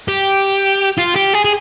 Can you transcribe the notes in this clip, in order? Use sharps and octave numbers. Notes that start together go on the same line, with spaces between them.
G4
F4
G4
G#4
G#4